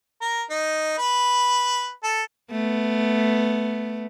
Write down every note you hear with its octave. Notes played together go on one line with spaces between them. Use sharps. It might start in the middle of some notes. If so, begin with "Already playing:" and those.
A#4
D#4
B4
A4
A3 B3